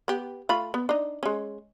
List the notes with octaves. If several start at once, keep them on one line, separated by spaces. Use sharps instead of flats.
B3 G4
A3 F4 B5
B3
D4 D#4
G#3 C#4